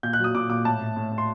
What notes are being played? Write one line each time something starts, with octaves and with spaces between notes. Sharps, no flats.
A#2 G6
F#6
F#3
D#6
A#2 D6
A#2 D6
A2 A5
A2
A2
A2
C6